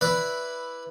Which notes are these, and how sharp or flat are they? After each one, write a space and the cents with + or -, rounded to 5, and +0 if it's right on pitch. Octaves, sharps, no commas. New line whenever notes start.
E4 +0 B4 +0 D5 +0